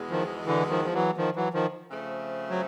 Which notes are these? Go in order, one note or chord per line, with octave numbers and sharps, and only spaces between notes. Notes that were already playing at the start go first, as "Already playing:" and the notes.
Already playing: E2 B2 G#3 B3
D#3 F3
D3 E3
D#3 F3
F3
E3 F#3
D#3 F3
E3 F#3
D#3 F3
C#3 F3 A3 C4
F#3